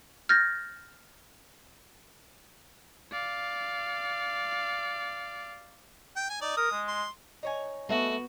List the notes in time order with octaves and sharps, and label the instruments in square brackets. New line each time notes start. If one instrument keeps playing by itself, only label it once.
[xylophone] F6 G6 A6 A#6
[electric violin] D5 F5
[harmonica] G5
G#5
[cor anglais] D#4 [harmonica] D5
[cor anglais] A#4 [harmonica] D#6
[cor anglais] G#3
[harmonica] C6
[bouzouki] D#4 C#5 G#5
[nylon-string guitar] A3 E5 [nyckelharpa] B3 [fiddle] F#4